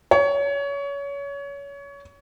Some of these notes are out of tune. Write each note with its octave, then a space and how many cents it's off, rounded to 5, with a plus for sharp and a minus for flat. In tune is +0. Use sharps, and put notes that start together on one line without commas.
C#5 +25